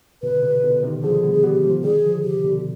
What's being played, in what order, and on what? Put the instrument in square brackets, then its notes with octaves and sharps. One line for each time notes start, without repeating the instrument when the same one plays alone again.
[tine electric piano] B2 D3 [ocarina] B4
[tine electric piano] D3
C3
B2 D3
C3 D#3
[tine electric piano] D3 F3 [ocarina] G#4
[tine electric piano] G3 B3
[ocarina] G#4
[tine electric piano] G3 B3 [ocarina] G4
[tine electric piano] F3 G#3
[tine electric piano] D#3 G3 [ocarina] G#4
[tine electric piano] D3 F3
[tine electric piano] C3 [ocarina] G4
[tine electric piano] B2 D3